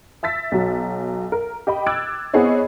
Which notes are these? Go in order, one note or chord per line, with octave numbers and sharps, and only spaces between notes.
E5 E6 A6 B6
B1 F#3
A#4
G4 D#5 G5 B5
D6 E6 F#6 G#6 A6 D7
B3 C4 E4 G#4 C#5 D#5